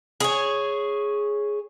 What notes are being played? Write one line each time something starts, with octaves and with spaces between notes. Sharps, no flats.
G#4 C#5